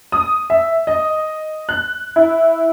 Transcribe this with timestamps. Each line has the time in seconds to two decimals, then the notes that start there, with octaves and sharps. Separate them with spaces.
0.12 D#6
0.50 E5
0.87 D#5
1.69 F#6
2.16 E4